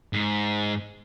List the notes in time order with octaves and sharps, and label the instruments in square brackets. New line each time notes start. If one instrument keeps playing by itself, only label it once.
[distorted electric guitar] G#2